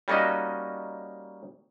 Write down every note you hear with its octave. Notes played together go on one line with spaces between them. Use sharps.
G3 A#3 C#4 D#4 F#4 D#5